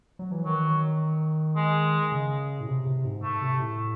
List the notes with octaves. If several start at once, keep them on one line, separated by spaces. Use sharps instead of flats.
F#3
E3
D#3 F#3
G#3
C#3
A2
C3
C3
G#2
A3
C3
A2